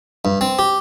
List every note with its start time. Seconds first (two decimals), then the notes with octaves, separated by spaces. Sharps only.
0.25 G2
0.41 C4
0.59 G4